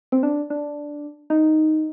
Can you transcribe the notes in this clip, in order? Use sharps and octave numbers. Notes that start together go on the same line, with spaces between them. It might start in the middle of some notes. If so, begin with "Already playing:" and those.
C4
D4
D4
D#4